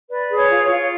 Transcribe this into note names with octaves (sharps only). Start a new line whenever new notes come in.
B4 D5
G#4
C#5
F4
C#5
F4